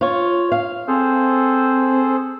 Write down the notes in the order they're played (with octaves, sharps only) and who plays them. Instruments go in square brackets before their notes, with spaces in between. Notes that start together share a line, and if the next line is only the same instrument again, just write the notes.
[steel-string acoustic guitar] F4 C#5
F5
[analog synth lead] C4 [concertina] G#4 A4 C5